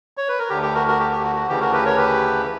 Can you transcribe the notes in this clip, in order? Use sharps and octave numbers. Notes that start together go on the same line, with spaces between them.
C#5
B4
A#4
D2 D3 G4
G4
F#4 A#4
F#4 A#4
G4
G4
F#4
F#4
D2 C#3 E3 G4
F#4 A#4
G4 B4
A#4 C#5
G4 B4